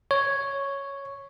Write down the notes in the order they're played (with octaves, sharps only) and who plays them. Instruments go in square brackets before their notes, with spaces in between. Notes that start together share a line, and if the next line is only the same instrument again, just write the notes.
[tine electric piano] C#5